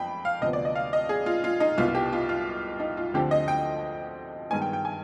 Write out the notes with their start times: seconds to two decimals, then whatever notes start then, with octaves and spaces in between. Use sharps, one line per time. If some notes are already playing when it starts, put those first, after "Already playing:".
Already playing: F2 G5 B5
0.25 F5
0.41 D2 C3 F3 B3 D#5
0.53 D5
0.65 D#5
0.75 F5
0.93 D#5
1.09 G#4
1.26 F4
1.44 F4
1.60 D#4
1.78 C2 B2 B3 F4
1.88 F4
1.95 G4
2.13 F4
2.29 F4
2.80 D#4
2.97 F4
3.14 D2 D3 F3 C4 G4
3.31 D#5
3.48 G5
4.50 G2 D#3 G#3 B3 G#5
4.62 G5
4.73 G5
4.85 G#5